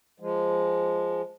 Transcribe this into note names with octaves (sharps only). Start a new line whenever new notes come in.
F3 G#3